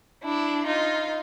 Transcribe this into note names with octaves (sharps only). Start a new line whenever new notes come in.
D4 E4
D#4 F4